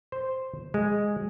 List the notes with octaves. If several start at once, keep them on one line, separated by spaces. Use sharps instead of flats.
C5
G#3